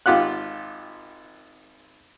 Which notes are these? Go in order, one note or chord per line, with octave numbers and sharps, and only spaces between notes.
G#1 F4 G4 F#5 F#6